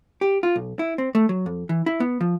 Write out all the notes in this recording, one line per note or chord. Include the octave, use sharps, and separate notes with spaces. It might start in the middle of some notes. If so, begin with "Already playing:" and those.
G4
F4
B1
E4
C4
A3
F#3
F2
E3
E4
B3
F3